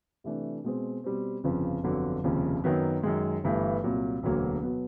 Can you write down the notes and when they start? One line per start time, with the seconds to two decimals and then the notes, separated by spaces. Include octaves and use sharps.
0.24 C3 E3 A3 D4
0.64 B2 G#3 C4
1.04 B2 G3 C4
1.44 G1 F2 C#3 F3
1.84 G1 F2 D3 F#3
2.24 F1 D#2 C#3 F3
2.64 F#2 D#3 F#3 B3
3.03 F#2 D#3 G#3
3.44 G1 G2 E3 A3
3.84 C2 A#2 F#3
4.23 E1 D2 D3 F#3 A#3
4.63 B2 F#3 B3